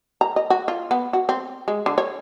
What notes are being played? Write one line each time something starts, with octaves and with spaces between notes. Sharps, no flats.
A#5
D#5
F#4
F4
B3
F#4
C4
G#3
D3
C#5